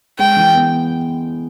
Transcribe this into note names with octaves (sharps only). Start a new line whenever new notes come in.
G#3 G5
E3
B3